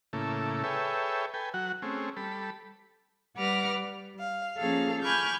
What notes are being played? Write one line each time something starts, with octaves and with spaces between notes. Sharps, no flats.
A2 C#3 A#3 E4 A4
G#4 A4 B4 C#5 E5 G5
A4 B4 G5 G#5
F#3 F#4 F#5
A3 C4 C#4 G#4
G3 A4 B5
G3 B4 F#5 D6 F6 A#6
G3
F5
F3 A#3 C#4 G#4 A4 F5
G#5 B5 C#6 D6 F6 G6